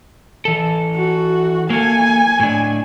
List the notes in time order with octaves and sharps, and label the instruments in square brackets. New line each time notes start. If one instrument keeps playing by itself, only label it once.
[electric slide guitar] E3 A4
[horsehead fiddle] F#4
[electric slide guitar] A#3 A4 [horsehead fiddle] G#5
[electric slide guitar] A2 D4